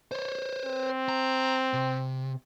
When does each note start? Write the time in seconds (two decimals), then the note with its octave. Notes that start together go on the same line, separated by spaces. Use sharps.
0.12 C5 C#5
0.65 C4
1.09 A#5
1.73 C3